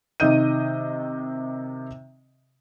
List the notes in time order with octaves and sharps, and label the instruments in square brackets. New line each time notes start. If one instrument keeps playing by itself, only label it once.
[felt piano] C3 D#3 D#5 G6 D#7